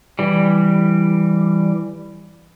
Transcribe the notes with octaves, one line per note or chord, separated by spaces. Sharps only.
E3 G3